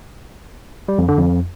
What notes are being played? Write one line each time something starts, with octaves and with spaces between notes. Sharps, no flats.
G3
F2
D3
F2